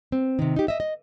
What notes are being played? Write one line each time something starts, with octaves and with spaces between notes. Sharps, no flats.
C4
C3 D#3
D#4 G4
D#5 E5
D#5